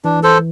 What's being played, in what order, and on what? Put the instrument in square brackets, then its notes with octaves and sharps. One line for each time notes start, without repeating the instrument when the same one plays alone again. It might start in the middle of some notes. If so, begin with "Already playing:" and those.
[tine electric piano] E3 [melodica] D4
[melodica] A4 C5